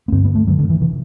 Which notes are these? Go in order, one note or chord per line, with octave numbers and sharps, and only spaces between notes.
B3
G2 D3 C4
B3
A3
F#2 D3 F#3
D3
E3
C3 E3